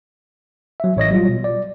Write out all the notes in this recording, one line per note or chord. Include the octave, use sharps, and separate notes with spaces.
F#3 E5
A1 C#5 D#5 A#6
F#3 G3 F4
B2
D5